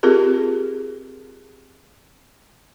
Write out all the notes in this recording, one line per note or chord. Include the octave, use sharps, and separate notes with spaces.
C4 F4 G4 G#4 A#4